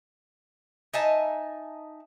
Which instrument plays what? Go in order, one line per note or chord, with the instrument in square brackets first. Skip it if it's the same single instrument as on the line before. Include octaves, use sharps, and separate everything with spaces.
[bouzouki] D#4 E5 G#5 A5